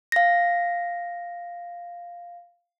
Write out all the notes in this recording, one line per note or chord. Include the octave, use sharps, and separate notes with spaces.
F5 A#6